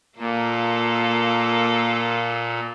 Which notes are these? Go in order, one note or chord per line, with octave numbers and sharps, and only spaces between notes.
A#2 A#3 F4 A4